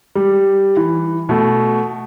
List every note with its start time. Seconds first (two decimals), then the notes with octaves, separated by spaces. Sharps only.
0.15 G3
0.77 E3
1.29 B2 A3